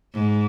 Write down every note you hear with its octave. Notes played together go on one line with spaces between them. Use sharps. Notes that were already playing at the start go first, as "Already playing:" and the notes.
G#2